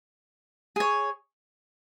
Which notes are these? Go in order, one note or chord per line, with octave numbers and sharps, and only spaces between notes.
G#4 C#5